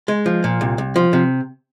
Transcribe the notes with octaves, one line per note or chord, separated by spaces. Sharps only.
G#3
F3
A#2
C2
C2
F3
C3